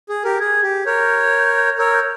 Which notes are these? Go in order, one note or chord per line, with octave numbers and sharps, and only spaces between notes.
G#4
G4 A#4
G#4 G#6
G4
A#4 C#5 G6
A#4 C#5 E6
G6